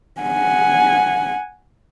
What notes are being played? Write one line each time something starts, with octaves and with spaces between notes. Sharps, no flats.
F#5 G#5